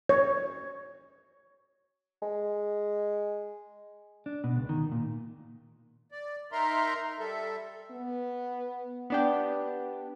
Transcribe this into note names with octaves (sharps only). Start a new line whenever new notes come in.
C#5
G#3
D4
B2
C#2
D#3
A#2
D5
D#4 A#4 E5 A#5 C6
G3 A4 E5
B3
B3 D4 G4